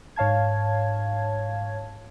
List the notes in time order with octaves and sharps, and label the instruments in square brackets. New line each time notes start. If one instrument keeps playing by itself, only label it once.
[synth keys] G#2 C#5 F5 A5 G#6